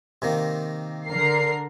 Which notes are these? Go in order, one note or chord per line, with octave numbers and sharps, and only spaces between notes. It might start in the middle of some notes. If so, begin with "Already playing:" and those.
C3 D#3 A#3
D3 A#4 C7